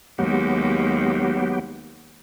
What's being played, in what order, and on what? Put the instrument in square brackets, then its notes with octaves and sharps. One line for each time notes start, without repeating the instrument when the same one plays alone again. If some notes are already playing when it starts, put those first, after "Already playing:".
[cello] D#2 G#3 [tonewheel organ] F#3 B3 G4